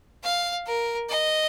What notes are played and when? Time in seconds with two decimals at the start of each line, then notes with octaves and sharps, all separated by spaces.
0.24 F5
0.66 A#4
1.09 D#5